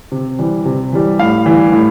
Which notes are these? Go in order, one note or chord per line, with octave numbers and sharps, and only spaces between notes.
C3
E3 G3
C3
E3 G3
A2 F5
E3 G3
A2